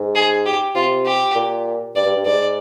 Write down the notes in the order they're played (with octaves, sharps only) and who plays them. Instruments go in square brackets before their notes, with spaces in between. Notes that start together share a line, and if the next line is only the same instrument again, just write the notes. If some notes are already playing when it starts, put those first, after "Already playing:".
Already playing: [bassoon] G#2
[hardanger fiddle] G#4
G4
[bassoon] C3 [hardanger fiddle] F4
[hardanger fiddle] G4
[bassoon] A#2
[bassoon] G2 [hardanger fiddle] D5
[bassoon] G2
G2
[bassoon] G#2 [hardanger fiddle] D5